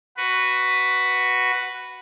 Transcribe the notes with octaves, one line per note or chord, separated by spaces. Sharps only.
F#4 B4